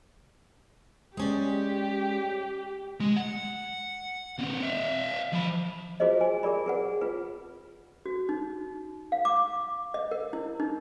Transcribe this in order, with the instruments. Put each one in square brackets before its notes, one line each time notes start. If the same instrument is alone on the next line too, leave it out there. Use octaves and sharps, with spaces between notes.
[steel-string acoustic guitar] G#3 C#4 D5 [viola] G4
[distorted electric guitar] G#3
F#5
A#3 C4
E5 F5
F3 B5
[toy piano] F4 F#4 G#4 B4 C5 D#5
G#5
G4 G#4 A#4 D5 B5
G#4 B4 F#5
F4 B4
F#4
D#4
F5
D6
D#5
A#4
E4
D#4